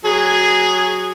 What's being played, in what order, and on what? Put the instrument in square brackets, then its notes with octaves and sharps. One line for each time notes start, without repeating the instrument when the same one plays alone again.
[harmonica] F#3 G#4